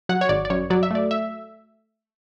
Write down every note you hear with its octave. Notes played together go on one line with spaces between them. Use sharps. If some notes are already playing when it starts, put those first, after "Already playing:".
F#3 F#5
C#5
G#1 D5
D5
F#2 C#5
F#3 D5
E5
A3 D5
E5